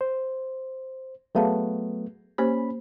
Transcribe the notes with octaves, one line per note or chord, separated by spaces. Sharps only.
C5
F#3 A3 B3 G#4 F5 A5
A#3 C#4 G4 C5 B5